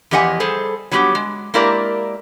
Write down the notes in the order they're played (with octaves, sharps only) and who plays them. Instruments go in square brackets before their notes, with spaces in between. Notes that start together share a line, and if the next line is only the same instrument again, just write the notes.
[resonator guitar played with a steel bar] E2 F3 G4 D#5 F#5 G#5
G3 G#4 A4 C5
F#3 G3 B3 F4 G4
G#3
G#3 A#3 E4 G4 A#4 D5